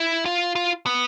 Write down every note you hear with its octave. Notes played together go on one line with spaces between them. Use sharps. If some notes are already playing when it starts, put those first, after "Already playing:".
Already playing: E4
F4
F4
B3